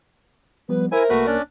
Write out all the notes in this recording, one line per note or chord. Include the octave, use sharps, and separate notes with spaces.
F3 G3 B3 B4
E4 A#4 C5 E5 G#5
C2 A3 A#3 F#4 B4 F#6
C#4 D4 D5